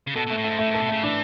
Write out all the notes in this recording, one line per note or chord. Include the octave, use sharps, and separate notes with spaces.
C#3
B2 A4
B2 A3
A2
G#2 A3
A2 A3
G#2 A4
B2
C#3 A3
E3 D4